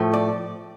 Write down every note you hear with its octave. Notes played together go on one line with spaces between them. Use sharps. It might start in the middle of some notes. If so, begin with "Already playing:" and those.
Already playing: A2 F3 A3
D5